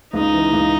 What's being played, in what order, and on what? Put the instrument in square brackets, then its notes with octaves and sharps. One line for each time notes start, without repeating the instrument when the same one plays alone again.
[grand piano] C#2 [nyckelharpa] D#4
[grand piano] E3
C#2